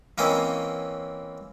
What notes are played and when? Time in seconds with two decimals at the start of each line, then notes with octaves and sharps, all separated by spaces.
0.18 E3 A#3 C4 C#4 D#5